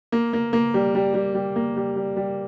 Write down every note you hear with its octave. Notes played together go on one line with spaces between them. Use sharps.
A#3
A#3
A#3
G3
G3
G3
G3
A#3
G3
G3
G3